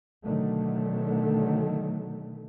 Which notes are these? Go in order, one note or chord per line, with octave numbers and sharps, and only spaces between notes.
B2 D3 D#3 F#3 A3